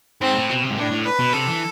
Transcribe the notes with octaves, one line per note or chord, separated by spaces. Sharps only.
G#2 C4
A2
B2
C3
G#2
A2 D4
A2
B4
B2
C3 A4
E3